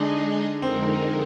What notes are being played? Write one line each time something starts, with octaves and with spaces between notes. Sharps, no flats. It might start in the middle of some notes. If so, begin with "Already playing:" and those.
Already playing: D3 G#3 D4 D#4 G#4 D#5
F2 D3 G#3 C4 D#4 A#4